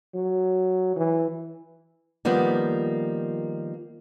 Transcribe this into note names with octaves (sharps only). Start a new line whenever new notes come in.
F#3
E3
D#3 F3 G3 A#3 B3